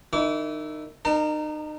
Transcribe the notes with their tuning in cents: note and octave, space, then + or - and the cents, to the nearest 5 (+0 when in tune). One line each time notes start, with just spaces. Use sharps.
D#3 -25 E4 +0 D6 -40
D#4 -35 A#4 -10 A5 +35